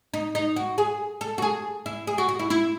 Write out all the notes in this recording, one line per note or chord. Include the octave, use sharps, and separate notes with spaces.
D#4
D#4
F#4
G#4
A4
F#4
G#4
E4
G#4
F#4
F#4
E4
E4